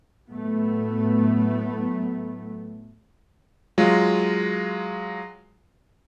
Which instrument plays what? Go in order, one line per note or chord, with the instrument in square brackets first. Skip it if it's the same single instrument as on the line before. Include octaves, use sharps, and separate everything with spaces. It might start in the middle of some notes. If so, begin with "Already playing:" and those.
[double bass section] A2 F#3 A3 B3
[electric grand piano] F#3 G#3 F4